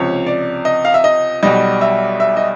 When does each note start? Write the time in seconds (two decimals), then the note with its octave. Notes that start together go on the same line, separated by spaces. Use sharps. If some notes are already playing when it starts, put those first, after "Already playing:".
Already playing: C#2 C3 F3 C#5
0.27 D5
0.65 D#5
0.85 F5
0.94 E5
1.04 D#5
1.43 B1 B2 G3 D#5
1.81 E5
2.20 E5
2.37 D#5